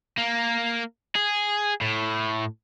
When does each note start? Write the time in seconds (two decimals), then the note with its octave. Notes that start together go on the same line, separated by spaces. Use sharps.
0.18 A#3
1.16 G#4
1.81 A2